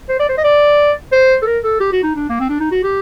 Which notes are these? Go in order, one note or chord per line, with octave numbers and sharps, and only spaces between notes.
C5
D5
C5
D#5
D5
C5
A4
A#4
A4
G4
F#4
D#4
D4
A#3
C4
D4
D#4
F#4
G4